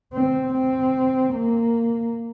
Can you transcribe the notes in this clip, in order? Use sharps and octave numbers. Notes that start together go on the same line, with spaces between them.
C4
C4
A#3